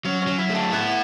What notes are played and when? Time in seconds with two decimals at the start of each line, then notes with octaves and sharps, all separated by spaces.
0.05 F#3 C#4
0.22 F#3 C#4
0.38 E4
0.50 A3
0.55 D4
0.72 B3 E4